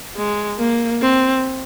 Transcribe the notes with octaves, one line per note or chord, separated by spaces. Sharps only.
G#3
A#3
C4